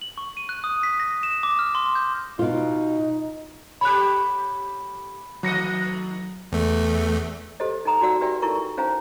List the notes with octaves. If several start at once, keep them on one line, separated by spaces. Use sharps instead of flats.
F#7
C#6
D#7
F#6
D#6
B6
A#6
E7
D6
F6
C6
G6
B2 D#4 F4
G4 A4 C#5 B5 F#6
D#3 F#3 A3 D#5 A#6 C#7
E2 A3
G4 A4 C5 D#5
D#4 A4 G5 A#5 D#6
D#4 F#4 D5 F#5 E6
G4 B4 D5 E5 G5 G#5
D#4 E4 A4 A#4 C#6
C#4 D#4 C5 F5 G#5 A#5